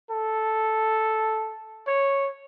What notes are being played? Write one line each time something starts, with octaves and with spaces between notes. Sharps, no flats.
A4
C#5